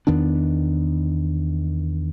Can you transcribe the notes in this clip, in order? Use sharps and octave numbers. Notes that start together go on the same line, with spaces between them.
E2 D#3 B3 D4